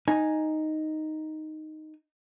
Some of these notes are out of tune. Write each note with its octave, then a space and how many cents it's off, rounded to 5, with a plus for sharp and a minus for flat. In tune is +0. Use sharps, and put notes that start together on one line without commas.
D#4 +0 G#5 +0